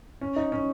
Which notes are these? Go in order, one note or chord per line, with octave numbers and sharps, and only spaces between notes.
C#4
D#4
C#4